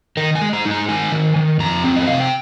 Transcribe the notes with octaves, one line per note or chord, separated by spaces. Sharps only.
D#3 A#4
G#5
G#3
A#5
D#4
A#5
D#3 G#5
D#3
D#3
F2 A#5
C4
D#5
C3 F5
G5